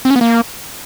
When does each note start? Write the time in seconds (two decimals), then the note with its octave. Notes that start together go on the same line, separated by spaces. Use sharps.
0.05 C4
0.10 C#4
0.16 B3
0.21 A#3